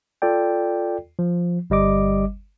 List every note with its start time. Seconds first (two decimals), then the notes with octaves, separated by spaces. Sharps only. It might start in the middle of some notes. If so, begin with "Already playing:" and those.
0.22 F4 A4 D5 G5
1.19 F3
1.70 G1 G3 D#5 D6